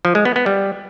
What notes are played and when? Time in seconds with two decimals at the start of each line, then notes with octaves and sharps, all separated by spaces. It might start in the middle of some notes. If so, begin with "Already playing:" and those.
0.05 F3
0.15 G#3
0.25 B3
0.36 B3
0.46 G3